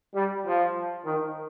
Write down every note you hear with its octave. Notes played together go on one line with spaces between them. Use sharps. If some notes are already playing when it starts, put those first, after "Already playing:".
G3
F3
D#3